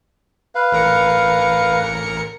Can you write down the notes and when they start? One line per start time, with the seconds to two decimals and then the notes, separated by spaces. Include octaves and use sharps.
0.55 B4 F5
0.72 A1 A#4 C#7